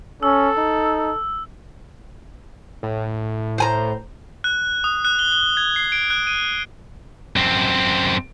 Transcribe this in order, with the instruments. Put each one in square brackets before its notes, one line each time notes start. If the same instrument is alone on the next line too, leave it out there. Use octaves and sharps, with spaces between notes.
[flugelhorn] C#4 [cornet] A4 [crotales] E6
[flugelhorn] D#4
[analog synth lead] A2
[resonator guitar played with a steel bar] C5 G#5 A#5
[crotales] F#6
D#6
F#6
G7
G7
G#6
C7
D7
F#6
D#7
[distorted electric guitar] F#2 C4